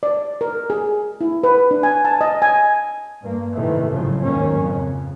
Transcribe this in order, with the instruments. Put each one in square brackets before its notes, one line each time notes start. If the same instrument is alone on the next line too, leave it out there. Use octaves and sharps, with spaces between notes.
[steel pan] D5
A#4
G#4
E4
B4
D4
G#5
A5
D#5
G#5
[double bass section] G2 A#3
A2 C3 D#3 E3 A3
G#1 F#2 A2 C#3 F3 F#3
D#2 G#2 D#3 F#3 A#3 C#4
F2 C#3